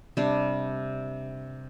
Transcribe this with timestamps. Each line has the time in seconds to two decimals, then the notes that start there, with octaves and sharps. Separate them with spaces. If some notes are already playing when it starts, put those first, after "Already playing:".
0.17 C3 G3 D4